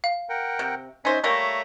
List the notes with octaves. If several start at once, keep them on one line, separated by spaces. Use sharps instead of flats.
F5
A#4 F#5 G5
C3
C#4 D#4 C5 E5 G#5
G3 A3 A#3 C#5 E5 A#5